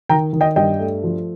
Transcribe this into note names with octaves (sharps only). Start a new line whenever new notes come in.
D#3 G5 A#5
D#3
D#5 G5
G2 D#5 G5
A3
F3